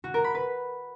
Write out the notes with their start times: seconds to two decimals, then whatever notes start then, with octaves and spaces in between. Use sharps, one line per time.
0.04 F#4
0.14 A#4
0.24 B5
0.35 B4